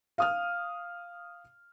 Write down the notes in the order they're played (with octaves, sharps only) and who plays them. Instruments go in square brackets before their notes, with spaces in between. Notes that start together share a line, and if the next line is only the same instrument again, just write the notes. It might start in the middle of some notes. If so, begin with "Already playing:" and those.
[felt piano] F5 D#6 F6